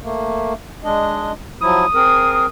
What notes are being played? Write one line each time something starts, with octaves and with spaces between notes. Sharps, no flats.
A3 A#3
G#3 D4 D#5
F3 F#3 E4 D#6
C4 G#4 A#4